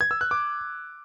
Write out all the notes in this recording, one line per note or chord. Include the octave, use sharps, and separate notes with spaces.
G#6
E6
F#6
D6